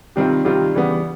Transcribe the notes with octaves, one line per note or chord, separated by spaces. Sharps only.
C3 D#3 G3 C4 F4
C3 D#3 G3 C4 F4
C#3 E3 G3 B3 D4